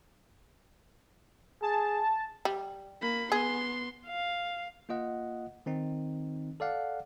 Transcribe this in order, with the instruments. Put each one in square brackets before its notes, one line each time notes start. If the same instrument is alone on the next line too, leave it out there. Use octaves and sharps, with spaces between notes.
[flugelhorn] G#4 [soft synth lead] A5
[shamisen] G3
[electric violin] A#3 B5
[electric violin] B3 C6 [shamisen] G#4
[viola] F5
[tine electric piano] A#3 F4 D#5 F#5
D#3 C4 D#4
A4 D5 F5 F#5